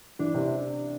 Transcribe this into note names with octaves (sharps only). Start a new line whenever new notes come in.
E3 D4
C3